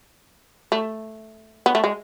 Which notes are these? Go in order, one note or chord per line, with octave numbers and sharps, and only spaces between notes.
A3
B3
A3
G#3